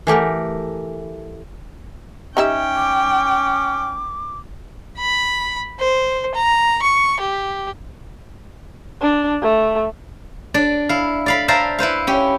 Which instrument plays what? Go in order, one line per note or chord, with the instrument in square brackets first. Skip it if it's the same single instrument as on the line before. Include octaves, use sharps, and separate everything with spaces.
[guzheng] E3 A3 G4 A#4
[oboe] C#4 [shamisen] D#4 G4 E5 [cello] G5
[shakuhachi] D6
[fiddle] B5
C5
A#5
C#6
G4
[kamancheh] D4
A3
[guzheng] D4 D5
E4 F5
D5 F5 B5
C5 D5 E5 F5 A5 A#5
E4 B4 C5 F5
C#4 G4